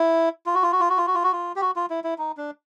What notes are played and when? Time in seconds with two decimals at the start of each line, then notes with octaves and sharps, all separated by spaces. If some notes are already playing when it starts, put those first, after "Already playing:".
Already playing: E4
0.46 F4
0.55 F#4
0.63 F4
0.72 F#4
0.80 F4
0.90 F#4
0.98 F4
1.07 F#4
1.15 F4
1.24 F#4
1.32 F4
1.56 G4
1.61 F#4
1.76 F4
1.90 E4
2.04 E4
2.18 D#4
2.37 D4